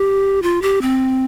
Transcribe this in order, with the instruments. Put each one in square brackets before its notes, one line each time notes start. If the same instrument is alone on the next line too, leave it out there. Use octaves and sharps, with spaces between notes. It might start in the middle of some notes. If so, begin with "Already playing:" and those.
Already playing: [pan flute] G4
F4
G4
C4